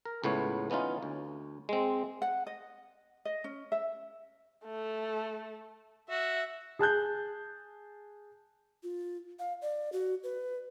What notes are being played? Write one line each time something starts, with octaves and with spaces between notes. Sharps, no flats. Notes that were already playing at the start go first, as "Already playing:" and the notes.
A#4
C#2 A2 B3 C#5
E3 B3 C#4 D#4 F4
D2
G#3 C4
F#5
D#5
D#5
C#4
E5
A3
F#4 E5
G#4 A5 F#6 G6
F4
F5
D5
F#4
B4